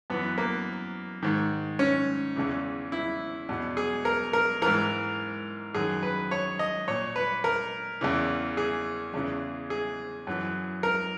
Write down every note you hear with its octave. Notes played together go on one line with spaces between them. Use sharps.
F#2 E3 B3
A#3
G#2 D#3
C#4
E2 C#3 E3
E4
E2 B2
G#4
A#4
A#4
G#2 E3 A#4
F#2 D#3 G#4
B4
C#5
D#5
A#2 C#5
B4
A#4
E2 C#3 E3
G#4
E2 C#3 E3
G#4
F#2 E3
A#4